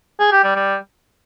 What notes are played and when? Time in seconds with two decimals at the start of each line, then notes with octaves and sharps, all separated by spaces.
0.20 G#4
0.32 G4
0.44 G3
0.56 G3